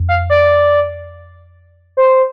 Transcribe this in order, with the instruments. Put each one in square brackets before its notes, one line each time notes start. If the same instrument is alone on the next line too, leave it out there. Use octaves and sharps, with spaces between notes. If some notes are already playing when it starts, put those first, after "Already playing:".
Already playing: [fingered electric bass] F2
[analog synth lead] F5
D5
C5